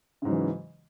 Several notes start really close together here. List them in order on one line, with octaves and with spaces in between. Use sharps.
C#3 G#2 F#3 E3